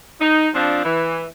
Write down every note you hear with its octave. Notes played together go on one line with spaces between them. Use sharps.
D#4
F3 C4 D4
E3